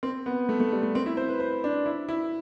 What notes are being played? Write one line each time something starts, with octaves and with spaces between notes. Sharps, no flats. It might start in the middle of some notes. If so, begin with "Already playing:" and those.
C4
B3
A3
A3
G3
A3
C4
E4
C5
B4
C5
D4
E4
E4